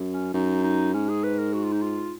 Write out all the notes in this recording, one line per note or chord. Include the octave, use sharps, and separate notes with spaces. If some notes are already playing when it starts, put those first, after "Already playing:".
Already playing: F#2
C#4
F#2 D#4
D#4
G#2 C#4
G#4
B4
A#4
F#4
F4
D#4
F4